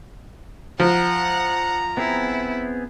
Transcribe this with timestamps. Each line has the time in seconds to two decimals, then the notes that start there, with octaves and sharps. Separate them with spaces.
0.80 F3 F#5 A#5
1.97 B3 C4 E4 G#4